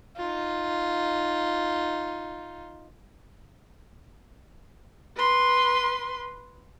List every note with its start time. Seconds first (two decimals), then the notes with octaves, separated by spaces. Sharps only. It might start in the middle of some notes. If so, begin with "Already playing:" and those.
0.16 D#4 F4
5.16 B4 C6